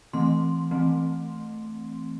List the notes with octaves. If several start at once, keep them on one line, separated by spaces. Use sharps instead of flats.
E3 A3 C4 C6
E3 A3 C4